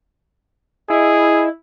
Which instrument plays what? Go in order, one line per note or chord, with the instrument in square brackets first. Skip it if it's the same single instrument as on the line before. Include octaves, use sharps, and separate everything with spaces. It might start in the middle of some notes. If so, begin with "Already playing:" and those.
[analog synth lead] E4 [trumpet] G#4 [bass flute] D#5